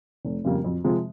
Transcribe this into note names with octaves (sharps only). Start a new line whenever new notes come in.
F1
F2 C#3 G3 A#3
F2
C3 F3 G#3